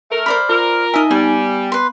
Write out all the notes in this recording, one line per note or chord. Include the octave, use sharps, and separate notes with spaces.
A3 A#4
C5 D5 B5 F6
F4 A#4
D#4 D#5 E5 G#5
G3 B3 G#5
B4 C6